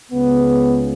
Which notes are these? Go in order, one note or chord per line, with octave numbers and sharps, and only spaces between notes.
C#2 C#3 B3